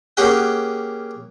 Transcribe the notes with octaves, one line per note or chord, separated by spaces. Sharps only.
A#3 C#4 G4 G#4 F#5 G5